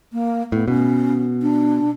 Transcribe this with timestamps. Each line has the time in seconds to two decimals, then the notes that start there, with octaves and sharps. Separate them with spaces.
0.13 A#3
0.52 A2 B3
0.68 B2 C#4
1.42 D4